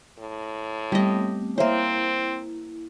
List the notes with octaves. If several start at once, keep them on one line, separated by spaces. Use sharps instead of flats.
A2
G3 A3 B3 C4 G4 D#5
A#3 C4 E4 C5 C#5 E5